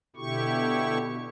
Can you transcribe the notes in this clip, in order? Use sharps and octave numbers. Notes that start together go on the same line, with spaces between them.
B2 D3 E4 G4 C#6